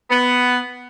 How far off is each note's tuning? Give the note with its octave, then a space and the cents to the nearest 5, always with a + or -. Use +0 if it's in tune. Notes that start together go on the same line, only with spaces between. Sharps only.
B3 +5